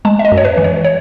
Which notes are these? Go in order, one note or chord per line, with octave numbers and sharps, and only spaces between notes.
G#3 A5
E5
D#5
F#2
C#5
B4
E3
C#5
C#5